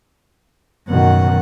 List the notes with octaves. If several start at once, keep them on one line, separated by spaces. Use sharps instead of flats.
F#2 B2 D#3 F#5